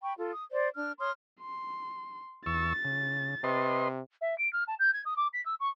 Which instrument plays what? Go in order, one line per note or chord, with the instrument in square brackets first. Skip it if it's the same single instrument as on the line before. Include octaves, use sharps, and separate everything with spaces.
[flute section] G5 B5 C#6
F4 A4
D#6
C5 D5
D4 F6
C#5 C6 D#6 F6
[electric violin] C6
[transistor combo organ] E2 C#6 E6 [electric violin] A6
[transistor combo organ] C#3
[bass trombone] C3 [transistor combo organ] B4 D#5 C6
[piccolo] E5
D7
F6
A5
G6
G#6
D#6
D6
B6
E6
C#6